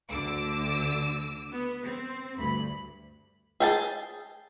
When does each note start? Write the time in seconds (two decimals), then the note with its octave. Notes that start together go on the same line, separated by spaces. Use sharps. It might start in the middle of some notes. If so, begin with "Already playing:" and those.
0.10 D2 D3 D6 E6
1.51 B3
1.84 C4
2.38 D2 G2 B5
3.60 G#4 G5 A5